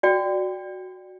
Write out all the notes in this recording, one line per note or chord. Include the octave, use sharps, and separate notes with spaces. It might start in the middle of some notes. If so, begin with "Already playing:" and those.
F#4 D5 G5